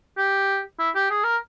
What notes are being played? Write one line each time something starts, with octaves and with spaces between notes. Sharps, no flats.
G4
E4
G4
G#4
A#4